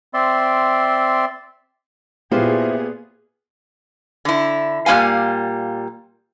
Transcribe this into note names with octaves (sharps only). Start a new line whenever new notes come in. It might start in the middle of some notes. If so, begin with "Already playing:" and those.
C4 D5 E5 C6
A#2 B3 E4 F4 G4 G#4 C5
D3 E4
A#2 G3 A#3 E4 F5 G#5